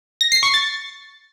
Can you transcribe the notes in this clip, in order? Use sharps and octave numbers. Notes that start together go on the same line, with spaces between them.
A#6
C7
C#6
A6